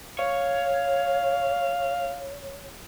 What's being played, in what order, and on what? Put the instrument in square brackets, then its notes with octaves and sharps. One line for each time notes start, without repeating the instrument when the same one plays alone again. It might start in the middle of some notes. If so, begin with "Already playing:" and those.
[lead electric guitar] C#5 [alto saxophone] F5